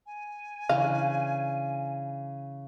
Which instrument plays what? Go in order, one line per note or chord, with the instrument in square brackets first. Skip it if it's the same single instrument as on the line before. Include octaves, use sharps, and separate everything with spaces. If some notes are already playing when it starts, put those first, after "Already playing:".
[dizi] G#5
[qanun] C#3 E3 D4 [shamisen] F5